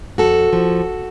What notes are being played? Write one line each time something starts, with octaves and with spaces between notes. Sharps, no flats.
F2 F#4 A4
F3